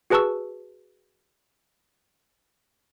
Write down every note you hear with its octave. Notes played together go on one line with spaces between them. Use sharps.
F#4 G#4 B4 A5 C#6 E6